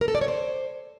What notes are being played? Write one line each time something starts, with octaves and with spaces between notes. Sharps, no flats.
A#4
A4
D5
C#5
C5